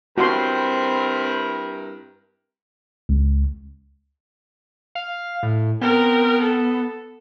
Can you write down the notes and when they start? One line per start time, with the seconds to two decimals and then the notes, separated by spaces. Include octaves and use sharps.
0.18 G2 C4 E4 F#4 A#4 A5 C6
3.09 C#2
4.95 F5
5.43 A2
5.81 B3 C4 A#4
6.42 A4